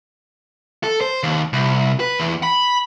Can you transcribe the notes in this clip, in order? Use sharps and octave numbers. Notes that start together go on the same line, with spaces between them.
A4
C5
D#2
C2
B4
E2
B5